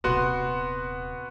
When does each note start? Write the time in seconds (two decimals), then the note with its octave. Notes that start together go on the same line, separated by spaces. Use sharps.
0.04 D#1 C3 B3 F#4 C6